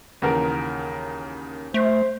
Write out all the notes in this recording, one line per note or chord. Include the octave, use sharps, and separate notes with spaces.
D#2 C#3 E3 A#4 F#5
A3 C5